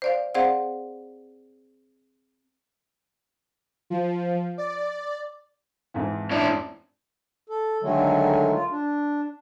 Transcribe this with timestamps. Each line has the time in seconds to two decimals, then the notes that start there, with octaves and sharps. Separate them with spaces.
0.02 C5 D5 F5
0.35 C4 G#4 C5 D5 F5 F#5
3.90 F3
4.58 D5
5.94 F2 G#2 E3
6.31 C#4 D4 E4
7.47 A4
7.82 D3 D#3 F#3 G#3 A3
8.53 F4
8.70 D4